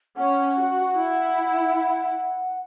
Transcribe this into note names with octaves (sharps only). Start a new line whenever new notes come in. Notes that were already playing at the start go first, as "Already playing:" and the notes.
C#4 F#5
F#4
E4